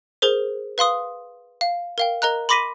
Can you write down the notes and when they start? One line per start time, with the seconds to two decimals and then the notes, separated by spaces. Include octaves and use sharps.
0.22 G#4 A#4 C5
0.78 B4 F5 C6 D#6
1.61 F5
1.98 A#4 F5 G5
2.22 A#4 D#5 A#5 F#6
2.49 B5 C6 D6 A#6 B6 D#7